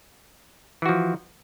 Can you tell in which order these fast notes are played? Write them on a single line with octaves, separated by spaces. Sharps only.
E3 F#4 F3